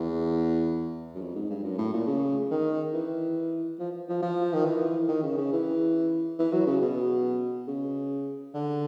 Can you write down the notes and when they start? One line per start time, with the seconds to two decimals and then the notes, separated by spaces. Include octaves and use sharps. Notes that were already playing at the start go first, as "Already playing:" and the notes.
Already playing: E2
1.15 F#2
1.21 F2
1.35 G#2
1.50 G2
1.64 F#2
1.78 A2
1.93 A#2
2.07 C#3
2.51 D#3
2.93 E3
3.79 F3
4.09 F3
4.22 F3
4.54 D#3
4.65 E3
5.09 D#3
5.23 C#3
5.38 C#3
5.53 E3
6.39 E3
6.52 F#3
6.67 C#3
6.82 B2
7.68 C#3
8.54 D3